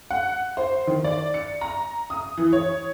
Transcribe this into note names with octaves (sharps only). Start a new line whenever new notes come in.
F#5
C5
D#3
D5
C#7
A#5
D#6
E3
C#5